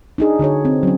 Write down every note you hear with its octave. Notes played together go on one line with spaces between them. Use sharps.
D4 D#4 G#4
D3 F#4 G#4 C#5
C4
F#3 C#4